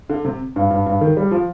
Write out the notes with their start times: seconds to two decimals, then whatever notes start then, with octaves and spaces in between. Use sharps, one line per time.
0.10 D3
0.25 C3
0.56 G2
0.71 G2
0.86 G2
1.01 D#3
1.17 G3
1.31 F3